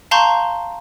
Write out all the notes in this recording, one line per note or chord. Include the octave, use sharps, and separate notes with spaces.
F5 A5 A#5 C6 C#6 G6